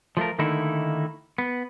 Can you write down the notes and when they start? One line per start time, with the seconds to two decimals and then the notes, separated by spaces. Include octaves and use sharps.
0.17 F3 A3 F4 A#4
0.39 D3 D#3 A3 A#3 D#4 E4
1.38 B3